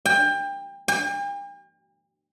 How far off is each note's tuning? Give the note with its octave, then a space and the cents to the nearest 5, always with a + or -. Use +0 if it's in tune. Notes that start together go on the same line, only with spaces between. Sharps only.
G5 +25
G5 +45